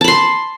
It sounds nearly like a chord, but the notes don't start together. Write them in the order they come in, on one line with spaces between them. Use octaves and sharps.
A5 B5 C6